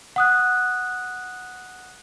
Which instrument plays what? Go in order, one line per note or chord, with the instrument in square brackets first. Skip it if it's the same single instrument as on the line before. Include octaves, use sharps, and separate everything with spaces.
[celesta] F#5 D#6 F#6